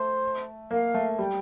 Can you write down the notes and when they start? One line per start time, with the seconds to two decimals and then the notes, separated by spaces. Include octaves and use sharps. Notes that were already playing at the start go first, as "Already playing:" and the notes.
Already playing: A3 C5
0.71 A#3 F5
0.94 A3
1.19 G3 G5